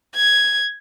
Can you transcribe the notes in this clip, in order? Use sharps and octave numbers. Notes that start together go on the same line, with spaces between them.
G#6